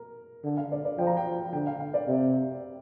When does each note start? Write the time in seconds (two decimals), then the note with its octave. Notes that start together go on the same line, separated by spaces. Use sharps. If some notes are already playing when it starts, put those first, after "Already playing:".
Already playing: A#4
0.44 D3
0.57 F5
0.72 D5
0.85 D5
0.98 F3 G5
1.07 A#5
1.17 G5
1.53 D3 G5
1.67 F5
1.80 F5
1.94 D5
2.08 C3